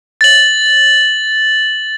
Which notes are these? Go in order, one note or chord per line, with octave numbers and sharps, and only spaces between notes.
A6 F#7